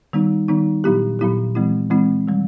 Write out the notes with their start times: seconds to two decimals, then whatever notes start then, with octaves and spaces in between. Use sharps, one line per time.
0.13 D#3 G3 B3 D#4
0.48 D#3 G3 B3 D#4
0.84 A#2 F#3 B3 E4 G4
1.19 A#2 F#3 B3 E4 G4
1.55 E3 G#3 C4 E4
1.90 E3 G#3 C4 E4
2.28 D#3 G3